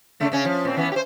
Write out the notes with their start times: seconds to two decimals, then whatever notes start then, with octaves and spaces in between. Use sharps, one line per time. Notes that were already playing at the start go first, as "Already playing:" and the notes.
0.20 C#3 A3 D4
0.32 C#3 C#4
0.45 F3
0.65 A#2 C4
0.77 E3 B3 C#4
0.92 G4 C5